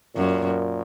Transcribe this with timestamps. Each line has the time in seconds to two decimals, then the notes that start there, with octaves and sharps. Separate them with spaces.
0.15 F#2 A#2